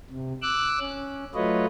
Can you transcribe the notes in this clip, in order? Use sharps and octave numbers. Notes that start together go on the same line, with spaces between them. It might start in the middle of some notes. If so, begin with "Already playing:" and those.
C3
D6 E6 F#6
C#4
F#3 A3 F4 B4 C#5 D#5